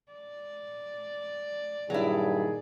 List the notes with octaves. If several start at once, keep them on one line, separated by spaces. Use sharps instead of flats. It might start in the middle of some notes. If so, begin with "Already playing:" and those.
D5
G2 A#2 D#3 F#3 E4 G#4